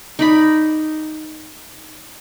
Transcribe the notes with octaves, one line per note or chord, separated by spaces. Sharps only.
D#4 D5 B5